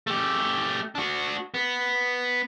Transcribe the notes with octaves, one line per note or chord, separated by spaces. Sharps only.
A3 G4
D4 F#4
B3